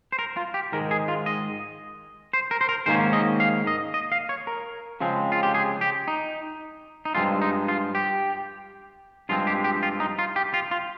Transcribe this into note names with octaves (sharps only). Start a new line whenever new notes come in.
C5
A#4
F4
G4
G#2 D#3 G#3 A#4
G#4
F4
D#5
C5
A#4
C5
A#4
G#2 D#3 A#3 C#4 C5
D#5
F5
D#5
D#5
F5
C#5
A#4
C#3 F3 G#3 C4
F4
G4
G#4
G4
D#4
D#4
G2 F3 G#3 C4 F4
D#4
F4
G4
G2 F3 G#3 C4 F4
G4
G4
F4
D#4
F4
G4
F4
F4